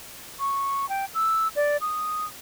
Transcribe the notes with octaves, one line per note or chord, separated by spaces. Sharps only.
C#6
G5
E6
D5
D#6